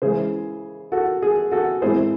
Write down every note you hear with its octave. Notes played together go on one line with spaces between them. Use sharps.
C#3 E3 G#3 G#4 C5
F#4 A4
G#4
F#4 A4
A2 G#3 C4 E4 G#4 C5